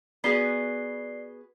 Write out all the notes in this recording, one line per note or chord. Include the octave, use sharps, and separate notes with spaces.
B3 F#4 G#4 D5 C7 G7